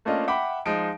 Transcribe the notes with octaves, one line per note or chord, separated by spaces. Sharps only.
A3 A#3 C#4 D4 F4 D#5
E5 F#5 G5 B5 D6
F3 G#3 D#4 D7